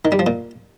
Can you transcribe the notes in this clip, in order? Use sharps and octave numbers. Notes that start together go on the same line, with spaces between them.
D#3
G3
F3
A#2